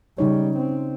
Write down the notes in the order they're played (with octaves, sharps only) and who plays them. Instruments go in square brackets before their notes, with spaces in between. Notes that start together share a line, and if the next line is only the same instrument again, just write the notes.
[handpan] C#3 D#4 C#5 [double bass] G3
[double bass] C4